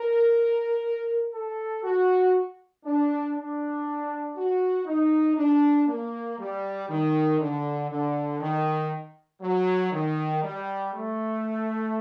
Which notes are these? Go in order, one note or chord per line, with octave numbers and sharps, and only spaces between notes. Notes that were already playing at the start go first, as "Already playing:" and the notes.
Already playing: A#4
A4
F#4
D4
D4
F#4
D#4
D4
A#3
G3
D#3
D3
D3
D#3
F#3
D#3
G3
A3